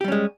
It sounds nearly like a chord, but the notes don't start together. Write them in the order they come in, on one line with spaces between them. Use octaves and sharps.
G4 G3 C#4 G#3